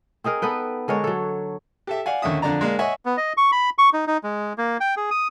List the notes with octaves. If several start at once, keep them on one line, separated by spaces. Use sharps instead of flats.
C4 D#4 G#4 A#4
B3 A4 B4 G5
D3 G#3 A#4 C#5
F#3 A4
G4 A4 E5
D5 F5 F#5 G#5
D#2 D3 C#4 E5 D#6
F2 D3 D4 D5 A#5
G#3 A#3 D4
C#5 D#5 E5 F#5 G#5
B3
D#5
C#6
B5
C#6
D#4
D#4
G#3
A#3
G5
G#4
D#6